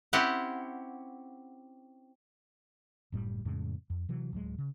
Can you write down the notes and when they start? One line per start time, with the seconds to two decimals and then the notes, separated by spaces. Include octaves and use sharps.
0.13 C4 C#4 E4 G4 F#5
3.12 F#1 A2 G3
3.45 F2 A2 C#3 G#3
3.90 F2
4.09 C3 E3 F#3
4.33 D1 F#3 G#3
4.58 C#3